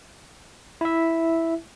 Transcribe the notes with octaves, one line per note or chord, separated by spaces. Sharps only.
E4 E5